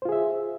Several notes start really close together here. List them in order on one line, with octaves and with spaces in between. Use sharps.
C5 F4 G#4 E5